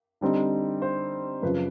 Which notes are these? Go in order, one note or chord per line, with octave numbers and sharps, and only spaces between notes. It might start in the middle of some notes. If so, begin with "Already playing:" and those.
D3 G3 C4 D#4
C5
F#2 C#3 F3 B4